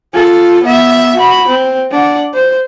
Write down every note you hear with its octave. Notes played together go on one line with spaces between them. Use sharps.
F4 A4
B3 E5
F#4 B5
C4
D4 F#5
C5